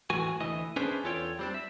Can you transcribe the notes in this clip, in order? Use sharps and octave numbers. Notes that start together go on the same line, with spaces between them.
A2 E3 F#4 G#5
D2 E3 D#5
C#4 D4 E4 G#4 B4 C5
E2 F4 A4 C#5 G5
G3 C4 D4
E5